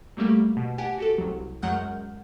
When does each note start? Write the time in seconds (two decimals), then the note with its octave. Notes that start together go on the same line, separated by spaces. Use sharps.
0.17 F#3 G3 A3 A#3 G4
0.57 B2
0.78 G4 F#5 G#5 A5
0.98 F#4 G4 A4
1.18 C2 F#3
1.62 F#2 F#3 G#3 F#5 F6 G6